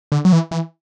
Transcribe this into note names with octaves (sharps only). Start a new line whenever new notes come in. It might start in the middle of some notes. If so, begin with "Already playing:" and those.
D3
F#3
E3
E3